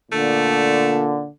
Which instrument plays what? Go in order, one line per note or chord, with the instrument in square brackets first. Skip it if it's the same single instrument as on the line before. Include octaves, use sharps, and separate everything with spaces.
[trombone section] A#2 D3 [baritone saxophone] A3